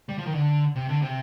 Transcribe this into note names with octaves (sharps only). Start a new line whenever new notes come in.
G3
F3
D#3
D3
C3
D3
C3